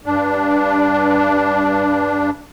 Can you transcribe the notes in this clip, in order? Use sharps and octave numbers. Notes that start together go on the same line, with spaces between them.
G2 D4